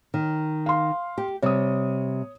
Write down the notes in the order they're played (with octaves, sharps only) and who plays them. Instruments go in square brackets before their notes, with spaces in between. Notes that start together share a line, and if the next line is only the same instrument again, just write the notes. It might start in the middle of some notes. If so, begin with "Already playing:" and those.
[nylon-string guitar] D#3
[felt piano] F5 C6
[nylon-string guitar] G4
[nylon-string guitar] C3 G3 [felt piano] C#5 D#6